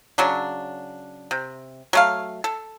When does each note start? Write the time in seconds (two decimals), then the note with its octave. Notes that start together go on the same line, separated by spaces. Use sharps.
0.18 C#3 F#3 D4
1.31 C3
1.93 F#3 A3 F5
2.44 A4